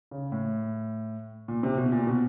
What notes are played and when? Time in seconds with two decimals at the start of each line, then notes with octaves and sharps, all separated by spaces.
0.11 C#3
0.32 A2
1.48 A#2
1.63 C3
1.78 B2
1.92 A#2
2.07 B2